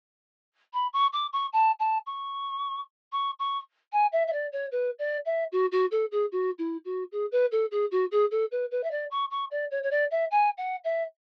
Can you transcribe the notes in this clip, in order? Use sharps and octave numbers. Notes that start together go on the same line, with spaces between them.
B5
C#6
D6
C#6
A5
A5
C#6
C#6
C#6
G#5
E5
E5
D5
C#5
B4
D5
E5
F#4
F#4
A4
G#4
F#4
E4
F#4
G#4
B4
A4
G#4
F#4
G#4
A4
B4
B4
E5
D5
C#6
C#6
D5
C#5
C#5
D5
E5
G#5
F#5
E5